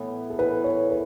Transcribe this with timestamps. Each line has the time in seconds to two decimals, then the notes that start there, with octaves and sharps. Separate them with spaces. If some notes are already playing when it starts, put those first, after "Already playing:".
Already playing: A2 E3 B3
0.30 A4
0.39 A2 E3 B3 B4
0.64 C#5
0.90 B4